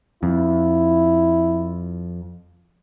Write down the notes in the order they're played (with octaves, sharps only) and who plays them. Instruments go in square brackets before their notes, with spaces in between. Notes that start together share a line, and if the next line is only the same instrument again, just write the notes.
[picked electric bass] F2 [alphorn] E4